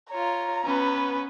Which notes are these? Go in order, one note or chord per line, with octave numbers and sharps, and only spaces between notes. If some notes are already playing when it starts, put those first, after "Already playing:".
F4 C#5 A#5
B3 C#4 B4